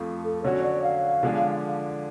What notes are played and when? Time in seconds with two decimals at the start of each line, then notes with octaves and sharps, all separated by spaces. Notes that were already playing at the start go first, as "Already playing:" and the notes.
Already playing: F2 F3 A3
0.24 A4
0.43 D3 F#3 C#4 F#4 C#5
0.64 D5
0.83 F5
1.23 D3 F3 G#3 D4